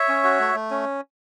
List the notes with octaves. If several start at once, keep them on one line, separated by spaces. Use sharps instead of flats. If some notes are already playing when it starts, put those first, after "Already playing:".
Already playing: C#5 E5
C#4
F#4
A3
A3
C#4